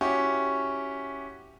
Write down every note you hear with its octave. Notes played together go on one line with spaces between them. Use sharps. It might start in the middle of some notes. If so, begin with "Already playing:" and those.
C#4 E4 F#4 G4